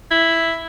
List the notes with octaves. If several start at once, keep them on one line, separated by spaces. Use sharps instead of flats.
E4